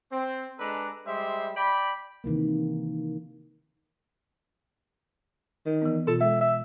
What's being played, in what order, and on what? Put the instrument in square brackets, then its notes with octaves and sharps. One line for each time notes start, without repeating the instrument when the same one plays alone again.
[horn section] C4
G#3 D4 A4 B4 A#5
G3 G#3 G4 C5 E5
D5 G5 B5
[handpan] C3 D#3 E3 A#3
[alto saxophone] D#3
[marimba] E3 B3
[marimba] B2 F4 [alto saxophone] A4
[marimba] G#3 [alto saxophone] E5
[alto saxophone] E5